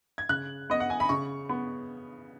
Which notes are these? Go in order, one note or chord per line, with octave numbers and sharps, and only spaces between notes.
G#6
C#3 F#6
B3 D#5
F#5
G#5
B5
C#3 C#6
B3